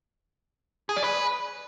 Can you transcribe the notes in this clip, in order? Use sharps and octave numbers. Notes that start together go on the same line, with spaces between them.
G#4
D5
B4